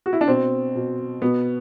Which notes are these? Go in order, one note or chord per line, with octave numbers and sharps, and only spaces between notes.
F#4
E4
D4
B2 C4
B2
B2 B3